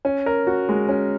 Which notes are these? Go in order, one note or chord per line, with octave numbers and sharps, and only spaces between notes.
C#4
A#4
F#4
G#3
C#4